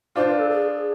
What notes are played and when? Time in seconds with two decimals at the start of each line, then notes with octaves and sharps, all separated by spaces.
0.16 D4 F4 C5
0.28 B4
0.38 A4
0.50 G#4